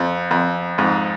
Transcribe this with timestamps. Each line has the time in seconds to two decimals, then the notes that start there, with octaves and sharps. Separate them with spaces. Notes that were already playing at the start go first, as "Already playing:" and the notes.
Already playing: F2
0.31 F2
0.78 F2 G#2